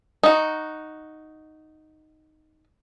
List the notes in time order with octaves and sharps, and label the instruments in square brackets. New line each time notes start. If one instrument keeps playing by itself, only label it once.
[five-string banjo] D#4 F#4